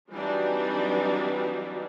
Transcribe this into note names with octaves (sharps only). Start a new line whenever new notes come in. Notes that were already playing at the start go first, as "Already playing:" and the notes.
E3 F#3 G3 C4 D4 D#4